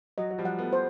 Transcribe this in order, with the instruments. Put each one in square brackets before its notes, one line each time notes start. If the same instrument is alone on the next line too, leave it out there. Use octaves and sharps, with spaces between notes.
[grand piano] F#3 [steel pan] D#5
[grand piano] F#3
F3 G3
[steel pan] F#5
[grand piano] A3 B3
[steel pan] C5